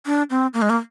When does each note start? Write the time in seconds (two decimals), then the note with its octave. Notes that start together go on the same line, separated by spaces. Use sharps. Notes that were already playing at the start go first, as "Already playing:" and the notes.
0.06 D4
0.30 C4
0.54 A#3
0.62 G#3
0.70 A#3